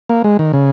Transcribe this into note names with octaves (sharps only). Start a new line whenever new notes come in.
A#3
G#3
D#3
C#3